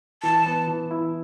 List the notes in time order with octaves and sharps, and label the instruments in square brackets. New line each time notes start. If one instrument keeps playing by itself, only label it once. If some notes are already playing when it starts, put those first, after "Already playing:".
[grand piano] E3 [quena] A5
[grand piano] B3
E3
E4